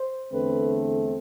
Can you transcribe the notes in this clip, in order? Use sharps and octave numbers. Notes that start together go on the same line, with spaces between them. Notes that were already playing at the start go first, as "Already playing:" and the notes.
Already playing: C5
E2 D3 A3 C4 B4